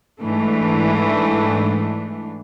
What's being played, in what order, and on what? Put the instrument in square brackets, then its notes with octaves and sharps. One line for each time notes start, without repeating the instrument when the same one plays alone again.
[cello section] G#2 E3 A3 D4